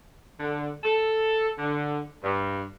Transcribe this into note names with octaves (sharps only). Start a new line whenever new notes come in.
D3
A4
D3
G2